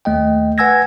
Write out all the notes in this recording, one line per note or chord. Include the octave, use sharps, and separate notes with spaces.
D#2 A3 D#5 G5
B4 F#5 G#5 E6 G#6 A#6